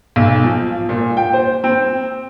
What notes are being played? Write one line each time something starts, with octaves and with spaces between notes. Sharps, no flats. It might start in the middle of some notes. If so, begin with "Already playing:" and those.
B1
F3
A#2
G5
C5
C4